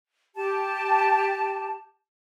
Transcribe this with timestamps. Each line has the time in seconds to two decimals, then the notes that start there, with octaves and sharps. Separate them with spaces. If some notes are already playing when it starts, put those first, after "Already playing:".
0.36 G4 A5